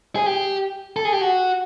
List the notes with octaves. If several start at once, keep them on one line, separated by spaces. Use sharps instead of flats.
G#4
G4
A4
G#4
G4
F#4